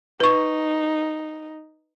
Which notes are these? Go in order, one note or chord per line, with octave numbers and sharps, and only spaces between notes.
D#4 B4 C#6